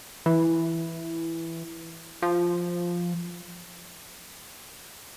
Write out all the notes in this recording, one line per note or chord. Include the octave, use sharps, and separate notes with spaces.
E3
F3